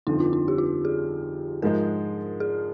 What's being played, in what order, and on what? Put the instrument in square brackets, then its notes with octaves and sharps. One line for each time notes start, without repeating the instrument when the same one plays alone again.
[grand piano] G1 F2 D3 F3 [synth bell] D#4
[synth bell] F4
D#4
G4
F4
G#4
[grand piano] G#2 F3 G#3 [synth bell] A#4
[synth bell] G#4